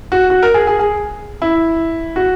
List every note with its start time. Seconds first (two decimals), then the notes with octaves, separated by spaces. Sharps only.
0.12 F#4
0.30 F#4
0.43 A#4
0.54 G#4
0.67 G#4
0.79 G#4
1.42 E4
2.16 F#4